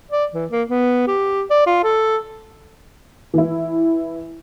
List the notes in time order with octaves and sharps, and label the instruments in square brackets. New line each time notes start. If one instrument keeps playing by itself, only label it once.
[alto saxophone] D5
E3
A#3
B3
G4
D5
F4
A4
[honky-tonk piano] E3 E4